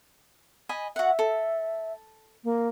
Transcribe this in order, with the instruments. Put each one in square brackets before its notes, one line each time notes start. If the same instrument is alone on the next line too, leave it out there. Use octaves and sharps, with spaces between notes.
[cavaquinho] D#5 G#5 B5
[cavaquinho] F#4 F#5 [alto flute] E5
[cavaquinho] A4
[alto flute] A#3